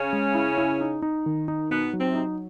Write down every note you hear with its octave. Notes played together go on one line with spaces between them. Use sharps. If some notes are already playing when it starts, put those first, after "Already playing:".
Already playing: C#3 C#4
G#3
E4
E4
D#4
D#4
D#3
D#4
B2 B3 D#4
F#3
C3 C4
D#4